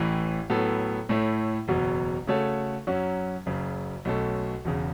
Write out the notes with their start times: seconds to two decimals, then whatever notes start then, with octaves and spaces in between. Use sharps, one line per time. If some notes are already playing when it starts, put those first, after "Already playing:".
Already playing: A1 A2 E3
0.50 A2 F#3 B3 A4
1.09 A2 A3 E4 A4 C#5
1.68 F#1 E2 B2 F#3
2.27 C#3 A3 F#4 A4 C#5
2.87 F#2 F#3 C#4 F#4
3.46 F#1 F#2 C#3
4.05 B1 B2 A3 C#4 A4
4.65 E1 E2 C#3